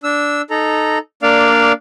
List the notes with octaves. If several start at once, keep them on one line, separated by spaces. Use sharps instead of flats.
D4 E6
D#4 A4 A#5
A#3 D4 D5 F5